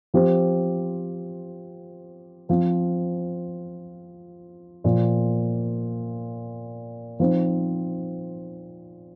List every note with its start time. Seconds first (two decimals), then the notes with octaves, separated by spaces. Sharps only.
0.14 F3 C4 G4 C5
2.49 F3 C4 F4
4.84 A#2 F3 A#3
7.20 F3 C4 D#4